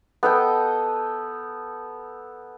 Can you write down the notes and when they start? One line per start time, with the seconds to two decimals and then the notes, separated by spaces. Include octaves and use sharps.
0.23 B3 A4 D#5 G5